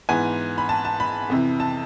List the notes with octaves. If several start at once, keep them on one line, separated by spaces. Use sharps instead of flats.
G#2 E3 B3 G#5
B5
A5
A5
B5
F2 C3 E3
A5